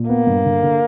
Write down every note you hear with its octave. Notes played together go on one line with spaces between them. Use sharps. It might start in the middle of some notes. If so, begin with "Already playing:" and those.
Already playing: A#2
A#3 B3
G2
D3
D3